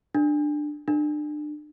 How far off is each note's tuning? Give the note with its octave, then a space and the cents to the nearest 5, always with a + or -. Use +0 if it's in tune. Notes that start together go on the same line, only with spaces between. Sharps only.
D4 +15
D4 +30